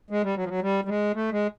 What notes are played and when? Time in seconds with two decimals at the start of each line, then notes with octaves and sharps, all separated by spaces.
0.10 G#3
0.23 G3
0.36 F#3
0.44 F3
0.49 F#3
0.62 G3
0.85 G3
0.89 G#3
1.14 A3
1.32 G#3